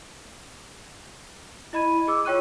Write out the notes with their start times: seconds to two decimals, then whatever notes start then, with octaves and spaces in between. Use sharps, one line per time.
1.73 E4 D#5 B5 G#6 D#7
2.08 G#4 D6 E6
2.25 F4 C#5 G5 C#6 F#6 D#7